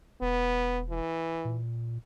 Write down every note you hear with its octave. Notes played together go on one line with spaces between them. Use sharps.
E1 B3
E3
A#2